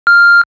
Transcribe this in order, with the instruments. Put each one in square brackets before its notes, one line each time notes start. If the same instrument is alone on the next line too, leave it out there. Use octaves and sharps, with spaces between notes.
[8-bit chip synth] F6